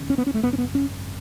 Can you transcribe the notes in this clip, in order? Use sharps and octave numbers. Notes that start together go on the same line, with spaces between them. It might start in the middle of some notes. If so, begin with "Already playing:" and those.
Already playing: E1 D#2 C#3
C#4
B3
C#4
A3
G#1 F#2 C#3 B3
C#4
B3
C#4